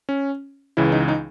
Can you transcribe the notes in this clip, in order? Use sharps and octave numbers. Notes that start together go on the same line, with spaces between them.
C#4
C#2 C#3 E3 E4
D#4
D#4